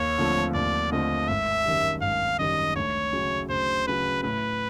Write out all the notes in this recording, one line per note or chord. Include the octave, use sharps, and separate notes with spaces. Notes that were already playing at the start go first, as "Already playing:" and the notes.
Already playing: D#2 C#5
D3 F3 A3 C4
D#2 D5
D3 F3 A3 C4 D#5
G#1 E5
F#2 D#3 G3
G#1 F5
F#2 D#3 G3 D#5
D2 C#5
C#3 F#3
D2 C5
C#3 F#3 B4
A2 B4